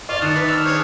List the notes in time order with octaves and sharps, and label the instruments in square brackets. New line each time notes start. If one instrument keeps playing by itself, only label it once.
[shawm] F4 [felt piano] D5 [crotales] C#6 D6 A6
[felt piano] D#3 [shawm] A5 [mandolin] D#6 [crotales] F#6 C7 C#7
[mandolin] B4 E5
[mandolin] E6 [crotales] F6 F7
[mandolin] D4 G#4 C5 [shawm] C#5